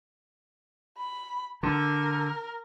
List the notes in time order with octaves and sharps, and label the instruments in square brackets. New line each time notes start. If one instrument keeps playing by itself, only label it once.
[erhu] B5
[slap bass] D3 [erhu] A#4